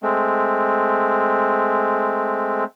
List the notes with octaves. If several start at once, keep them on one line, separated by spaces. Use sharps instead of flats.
G#3 A3 C4